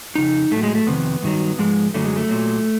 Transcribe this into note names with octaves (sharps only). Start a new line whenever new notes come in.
F2 C#3 D#4
A2 F#3 A3
G#3
A3
F2 C3 D#3 B3
G2 D#3 F#3
G#2 F3 G#3
F#2 D3 F#3 A3
G#3
A3
A#2 F#3